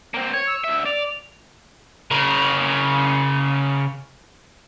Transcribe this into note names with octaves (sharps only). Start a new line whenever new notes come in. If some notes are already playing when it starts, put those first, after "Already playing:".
A#3 C4
C#5 G#6
E6
D2 E5
D5 F7
C#3 A#4